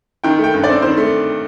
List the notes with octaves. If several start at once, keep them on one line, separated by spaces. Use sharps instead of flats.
D#3 G5
A3
G5
G2
C4 D5
D#3 C5
A3